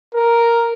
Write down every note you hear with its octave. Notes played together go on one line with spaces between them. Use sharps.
A#4